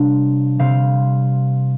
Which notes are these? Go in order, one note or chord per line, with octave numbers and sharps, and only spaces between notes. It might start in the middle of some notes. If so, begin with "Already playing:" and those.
Already playing: C3 G3 A#3 D4
C3 G3 C4 F5